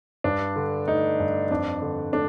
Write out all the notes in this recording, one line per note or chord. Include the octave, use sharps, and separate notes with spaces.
G2 D4
D3
A3 D#4
G2
F2 D4
D3
A3 D4